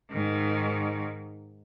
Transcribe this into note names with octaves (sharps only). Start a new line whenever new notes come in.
G#2 D#3